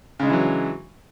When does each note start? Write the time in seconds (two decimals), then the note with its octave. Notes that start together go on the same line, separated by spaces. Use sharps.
0.20 C#3
0.23 G#3
0.26 D4
0.30 E3
0.33 F#3